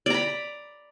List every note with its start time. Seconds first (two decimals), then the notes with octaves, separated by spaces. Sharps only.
0.06 D5
0.10 A#5
0.14 B5